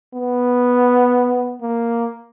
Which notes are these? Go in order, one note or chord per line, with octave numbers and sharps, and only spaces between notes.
B3
A#3